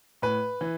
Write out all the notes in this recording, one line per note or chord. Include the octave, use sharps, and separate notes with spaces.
A2 B4
E3